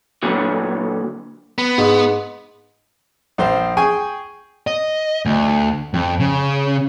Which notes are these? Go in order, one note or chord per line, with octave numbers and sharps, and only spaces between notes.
A#2 D3 F#3
B3
G#2
A#1 C5 F5
G#4 G5 G#5 C#6
D#5
D2
F2
C#3